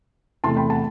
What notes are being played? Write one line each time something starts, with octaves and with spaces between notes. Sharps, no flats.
E2 C3 E3 A3 A5 C6
G5 B5
F#5 A5